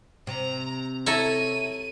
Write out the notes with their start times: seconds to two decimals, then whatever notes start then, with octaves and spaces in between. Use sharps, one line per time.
0.27 C3 A#5
1.07 E4 A4 C#5 A#5 D#7